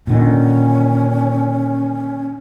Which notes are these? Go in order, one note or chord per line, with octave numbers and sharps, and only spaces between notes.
A#2 D3 D#3 C#4